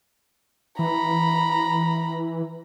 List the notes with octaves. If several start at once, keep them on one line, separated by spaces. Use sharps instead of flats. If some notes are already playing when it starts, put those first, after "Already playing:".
E3 A#5 B5